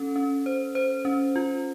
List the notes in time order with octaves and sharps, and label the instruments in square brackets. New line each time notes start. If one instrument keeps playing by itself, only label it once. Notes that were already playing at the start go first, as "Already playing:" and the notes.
Already playing: [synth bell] C#4 A4
C#4
C5
C5
C#4
F4